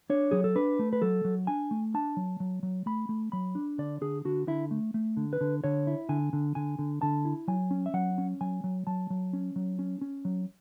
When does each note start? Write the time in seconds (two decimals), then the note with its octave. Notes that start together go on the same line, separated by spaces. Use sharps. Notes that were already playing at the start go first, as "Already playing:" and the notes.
0.10 D4 C#5
0.31 F#3 G#4
0.44 A4
0.55 D4 B4
0.79 A3
0.93 B4
1.02 F#3 A4
1.24 F#3
1.47 D4 G#5
1.71 A3
1.94 D4 A5
2.17 F#3
2.40 F#3
2.63 F#3
2.86 A3 B5
3.09 A3
3.32 F#3 B5
3.55 D4
3.78 D3 D5
4.01 D3 G#4
4.25 D3 F#4
4.48 D3 E4
4.71 A3
4.94 A3
5.17 D3
5.33 B4
5.41 D3
5.64 D3 C#5
5.87 E4
6.09 D3 G#5
6.33 D3
6.55 D3 G#5
6.79 D3
7.02 D3 A5
7.25 E4
7.48 F#3 G#5
7.71 C#4
7.86 E5
7.94 F#3 F#5
8.18 C#4
8.41 F#3 G#5
8.64 F#3
8.87 F#3 A5
9.10 F#3
9.33 C#4
9.56 F#3
9.79 C#4
10.01 C#4
10.25 F#3